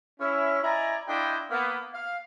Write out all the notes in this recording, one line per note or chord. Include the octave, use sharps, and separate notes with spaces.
C#4 E4
E4 D5 D#5 G#5 A#5
D4 E4 F4 D#5 G5
A#3 B3
F5